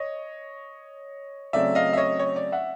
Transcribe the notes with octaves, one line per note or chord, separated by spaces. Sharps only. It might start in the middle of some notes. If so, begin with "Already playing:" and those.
Already playing: C#5 D#5
C#3 F#3 A3 C4 D5 E5
D#5 F5
E5
C#5 D#5
C#5
D5
E5 F#5